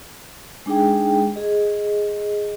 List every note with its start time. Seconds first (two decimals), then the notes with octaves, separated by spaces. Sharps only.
0.66 G#3 D4 D#4 G#4 G5
1.36 G#4 D#5